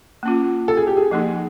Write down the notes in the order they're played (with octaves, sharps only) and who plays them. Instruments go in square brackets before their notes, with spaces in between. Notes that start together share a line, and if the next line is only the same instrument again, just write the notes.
[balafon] A#3 C#4 F4
[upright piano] A4
G#4
G4
G#4
[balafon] F3 A#3 D#4 [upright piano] G#4